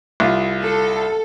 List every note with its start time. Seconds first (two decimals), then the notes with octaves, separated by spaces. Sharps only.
0.20 C2 F4
0.61 A4